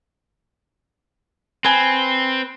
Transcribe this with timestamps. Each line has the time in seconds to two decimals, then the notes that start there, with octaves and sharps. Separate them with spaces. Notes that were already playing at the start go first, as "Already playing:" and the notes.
1.64 C4 B4 G#5